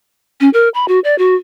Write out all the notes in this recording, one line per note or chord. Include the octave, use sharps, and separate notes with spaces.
C#4
A#4
B5
F#4
D5
F#4